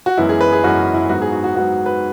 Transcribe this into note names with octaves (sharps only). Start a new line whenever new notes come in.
F#4
F#2 E3 G#3 B3 E4
G#4
B4
G#4
F#2 E3 G#3 B3 F#4
E4
G#2 F#3 B3 F#4
G#4
F#4
F#4
G#2 F#3 B3 F#4
B4